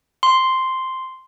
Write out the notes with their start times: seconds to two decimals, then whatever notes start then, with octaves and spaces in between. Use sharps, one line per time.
0.23 C6